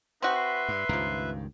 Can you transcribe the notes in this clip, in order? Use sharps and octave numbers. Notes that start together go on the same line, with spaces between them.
C4 D#4 F#4 B4 E5
C6
G2
C#2 G2 D#3 F3 A#3